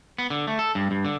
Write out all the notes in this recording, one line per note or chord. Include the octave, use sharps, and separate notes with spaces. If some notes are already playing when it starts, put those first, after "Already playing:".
B3
D3
A3
A4
G2
G2
D3